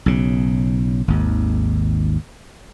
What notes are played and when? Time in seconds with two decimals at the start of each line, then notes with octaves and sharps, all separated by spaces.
0.06 B1 C#3
1.08 G#1 D#2